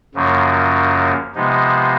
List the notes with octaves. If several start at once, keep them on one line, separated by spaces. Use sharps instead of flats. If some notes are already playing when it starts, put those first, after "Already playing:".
F#2 C#3 F3 A#3
C3 F3 G#3 B3 D#4